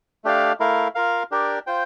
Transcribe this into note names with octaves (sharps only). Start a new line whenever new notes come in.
A3 D4 G4 D5 F5
A3 E4 A#4 F5
F4 A#4 F5
D4 G4 A#4 D5
F4 C5 G5